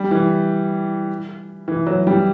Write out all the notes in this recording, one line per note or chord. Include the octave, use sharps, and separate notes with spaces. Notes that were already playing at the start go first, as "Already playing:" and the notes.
Already playing: G3
E3
E3
F#3
G3